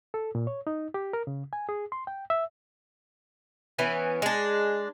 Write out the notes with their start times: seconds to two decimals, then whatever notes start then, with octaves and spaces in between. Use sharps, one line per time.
0.14 A4
0.35 A#2
0.47 C#5
0.67 D#4
0.94 G4
1.13 A#4
1.27 C#3
1.53 G#5
1.69 G#4
1.92 C6
2.07 G5
2.30 E5
3.78 E3 B3 C#4
4.22 G#3 D4